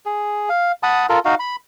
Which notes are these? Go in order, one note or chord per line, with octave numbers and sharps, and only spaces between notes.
G#4
F5
F#5 A5 B5 D#6
F4 A4 A#4
D#4 F#4 F5
B5